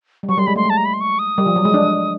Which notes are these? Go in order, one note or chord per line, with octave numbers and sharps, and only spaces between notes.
G3
F#3 C#6
G3 C6
G#3 B5
A3 C6
G#3 A5
A#5
B5
C6
C#6
D#6
G3
F3
F#3
G#3
D4